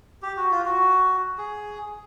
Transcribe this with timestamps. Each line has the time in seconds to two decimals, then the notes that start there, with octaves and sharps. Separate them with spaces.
0.22 G4
0.37 F#4
0.51 F4
0.66 F#4
1.38 G#4